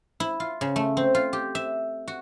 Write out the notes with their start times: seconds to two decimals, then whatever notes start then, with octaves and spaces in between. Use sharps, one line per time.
0.20 E4
0.40 F4
0.61 C#3
0.76 A3
0.97 C4
1.15 F4
1.33 G4
1.55 E5
2.08 F#4